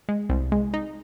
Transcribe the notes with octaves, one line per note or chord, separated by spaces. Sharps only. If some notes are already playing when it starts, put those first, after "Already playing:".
G#3
C2
G#3
D#4